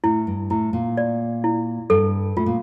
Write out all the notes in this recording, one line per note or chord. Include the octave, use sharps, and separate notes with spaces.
A2 E4
G2
A2 E4
A#2
D5
E4
G2 A4
A2 F4
A#2